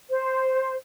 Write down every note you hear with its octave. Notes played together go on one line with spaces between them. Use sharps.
C5